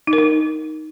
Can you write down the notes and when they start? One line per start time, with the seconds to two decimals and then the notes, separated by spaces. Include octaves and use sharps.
0.07 D#4
0.13 A#4
0.18 D#4